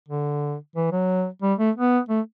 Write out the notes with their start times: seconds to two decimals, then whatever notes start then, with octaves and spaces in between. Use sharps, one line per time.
0.09 D3
0.76 E3
0.92 F#3
1.42 G3
1.59 A3
1.76 B3
2.09 A3